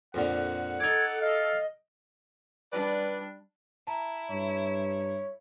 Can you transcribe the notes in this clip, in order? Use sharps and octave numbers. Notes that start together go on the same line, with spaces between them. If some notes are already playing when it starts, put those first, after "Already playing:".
F2 A#2 D3 F#5
D#4 A4 D6 G#6
D#5 F5
G3 D4 B4 D5
E4 A5 A#5
G2 C#5